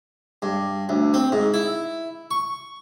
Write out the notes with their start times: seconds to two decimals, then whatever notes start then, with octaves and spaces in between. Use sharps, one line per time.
0.42 G2
0.89 D2
1.14 C4
1.32 G#2
1.54 E4
2.31 C#6